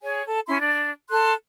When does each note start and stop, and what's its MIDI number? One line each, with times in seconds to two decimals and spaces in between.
0.02 0.22 68
0.02 0.22 73
0.02 0.22 80
0.26 0.39 69
0.48 0.57 61
0.48 0.57 64
0.48 0.57 84
0.60 0.91 62
1.09 1.33 69
1.09 1.33 84
1.09 1.33 90